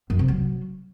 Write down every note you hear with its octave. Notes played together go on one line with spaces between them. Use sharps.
F#2
C3
F#3